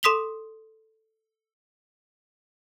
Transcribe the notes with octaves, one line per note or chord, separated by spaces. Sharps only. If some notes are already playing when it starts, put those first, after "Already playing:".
A4 C6 D#6 B6 F7 G7